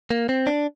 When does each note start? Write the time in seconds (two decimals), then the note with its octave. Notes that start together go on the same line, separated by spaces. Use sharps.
0.11 A#3
0.29 C4
0.47 D4